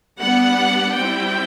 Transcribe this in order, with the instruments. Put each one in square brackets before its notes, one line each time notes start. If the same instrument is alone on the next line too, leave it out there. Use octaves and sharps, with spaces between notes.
[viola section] G3 B3 D4 F#5
G3 C4 E4 G5